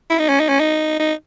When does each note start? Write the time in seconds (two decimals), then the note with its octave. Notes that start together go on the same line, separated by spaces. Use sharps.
0.10 E4
0.19 D#4
0.29 C#4
0.40 D#4
0.49 C#4
0.60 D#4
1.00 D#4